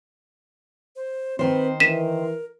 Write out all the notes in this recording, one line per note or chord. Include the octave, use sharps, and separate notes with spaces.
C5
D#3 C4 B4 C5
E3 A#4 B6 D#7 E7